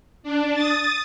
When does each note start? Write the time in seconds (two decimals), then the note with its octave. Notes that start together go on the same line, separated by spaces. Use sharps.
0.23 D4
0.54 D#6 A6